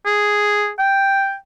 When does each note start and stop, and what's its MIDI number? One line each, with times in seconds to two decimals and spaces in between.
0.06 0.70 68
0.79 1.35 79